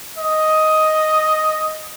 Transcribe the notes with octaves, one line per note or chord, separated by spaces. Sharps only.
D#5